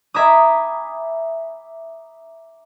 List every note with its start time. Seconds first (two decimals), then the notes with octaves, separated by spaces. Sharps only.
0.14 E5 G#5 A#5 B5 D6 D#6